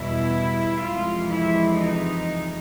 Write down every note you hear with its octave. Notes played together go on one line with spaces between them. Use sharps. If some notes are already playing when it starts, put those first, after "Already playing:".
Already playing: E2 B2 G3 E4
F2 C3 E3 G#3 F4
E4
D#4